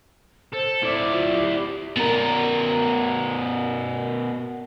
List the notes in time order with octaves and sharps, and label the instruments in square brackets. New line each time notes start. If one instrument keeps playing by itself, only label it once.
[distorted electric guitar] A4 [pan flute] C5
[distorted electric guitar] E4 D5
[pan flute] F4
G4
[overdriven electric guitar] B2 A#4